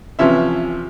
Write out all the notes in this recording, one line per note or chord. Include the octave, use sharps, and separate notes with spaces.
C3 E3 F3 C#4 E5